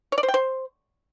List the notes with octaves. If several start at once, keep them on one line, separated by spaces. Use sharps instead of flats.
C#5
D5
C5
G5
C5